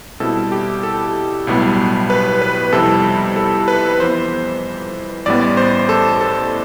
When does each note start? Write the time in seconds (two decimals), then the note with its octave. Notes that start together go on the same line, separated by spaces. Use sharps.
0.20 B2 G3 C4 E4 A4
0.52 G4
0.83 A4
1.47 B1 A2 G3 B3
2.10 B4
2.42 B4
2.72 F2 C3 G3 C4 E4 A4
3.36 A4
3.68 B4
4.00 F2 E3 B3 C5
5.26 A1 A2 G3 B3 D5
5.57 C5
5.89 A4
6.21 A4